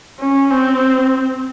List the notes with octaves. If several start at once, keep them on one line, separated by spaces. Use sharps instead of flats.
C#4
C4